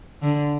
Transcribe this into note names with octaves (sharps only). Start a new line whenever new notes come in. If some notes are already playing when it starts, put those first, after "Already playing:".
D3